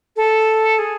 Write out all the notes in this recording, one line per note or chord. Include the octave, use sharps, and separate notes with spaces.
A4
G#4